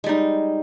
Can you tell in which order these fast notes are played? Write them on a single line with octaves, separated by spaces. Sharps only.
G#3 G3 D#4